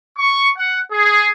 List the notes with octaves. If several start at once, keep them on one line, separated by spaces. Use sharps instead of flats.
C#6
F#5
G#4